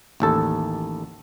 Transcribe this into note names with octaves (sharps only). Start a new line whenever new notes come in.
A1 D#2 A4